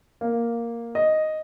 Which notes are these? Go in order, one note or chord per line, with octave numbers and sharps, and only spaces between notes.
A#3
D#5